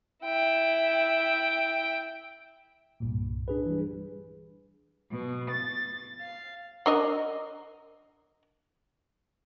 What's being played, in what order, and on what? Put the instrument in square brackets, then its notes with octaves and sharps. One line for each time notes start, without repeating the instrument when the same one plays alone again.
[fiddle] E4 G5
[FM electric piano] C2 G2 A#2
[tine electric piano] D4 G#4 B4
[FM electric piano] E3 G3
[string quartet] B2
A6
F5
[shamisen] D4 A#4 D#5